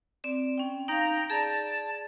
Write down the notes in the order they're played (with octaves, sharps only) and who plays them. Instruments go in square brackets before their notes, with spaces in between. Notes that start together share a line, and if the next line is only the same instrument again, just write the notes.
[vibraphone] C4 D5
C#4 G5
[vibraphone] D#4 F5 [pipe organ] G5 A#5
[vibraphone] G#4 D5 [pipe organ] A5